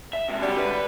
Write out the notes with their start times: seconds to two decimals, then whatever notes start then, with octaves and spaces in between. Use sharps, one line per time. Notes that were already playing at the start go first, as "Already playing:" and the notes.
0.13 E5
0.28 C3 G#3
0.41 D3 F#3 G3
0.58 B4